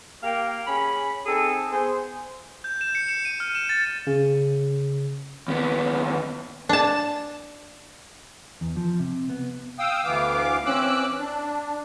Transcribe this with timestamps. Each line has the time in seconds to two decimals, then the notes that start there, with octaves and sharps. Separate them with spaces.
0.23 A#3 G4 F5 G5
0.66 C#4 G#4 B5
1.25 C4 D#4 G#4 A4
1.71 B3 G#4 C5
2.64 G6
2.81 E7
2.95 C#7
3.09 E7
3.25 D#7
3.40 F6
3.55 E7
3.69 A6
4.07 C#3
5.48 D#2 B3
6.69 D4 A5
8.61 E2
8.77 F3
8.99 C3
9.29 B3
9.79 F5 G5 D#6 E6
10.04 D2 E3 B3 F5 D6
10.66 E3 C4 C#4 D6 E6 F#6
11.19 D4